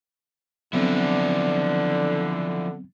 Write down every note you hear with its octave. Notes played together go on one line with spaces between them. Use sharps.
D3 F3 F#3 B3 C4 E4